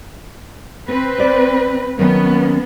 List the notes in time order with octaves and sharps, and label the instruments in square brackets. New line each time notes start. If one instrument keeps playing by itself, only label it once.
[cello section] C4 B4
[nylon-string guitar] C5 D5
[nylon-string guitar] D#3 F#3 C#4 [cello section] B3